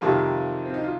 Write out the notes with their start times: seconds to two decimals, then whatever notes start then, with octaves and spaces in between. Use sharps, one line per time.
0.01 F2 C3 D#3 G3 F4 A#4
0.65 C4
0.74 D#4
0.84 F4